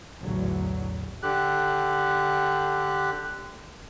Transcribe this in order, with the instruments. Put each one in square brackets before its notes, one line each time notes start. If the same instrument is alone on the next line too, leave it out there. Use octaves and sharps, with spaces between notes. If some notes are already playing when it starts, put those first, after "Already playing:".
[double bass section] B1 E2 A2 D3 F#3
[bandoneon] D3 G4 F#6